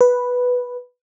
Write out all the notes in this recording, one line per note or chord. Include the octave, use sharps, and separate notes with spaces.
B4